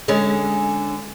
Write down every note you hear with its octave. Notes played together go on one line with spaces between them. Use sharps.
D3 G#3 C#4